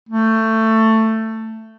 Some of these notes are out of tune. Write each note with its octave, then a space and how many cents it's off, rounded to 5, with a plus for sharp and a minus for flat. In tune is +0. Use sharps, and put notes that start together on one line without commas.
A3 +15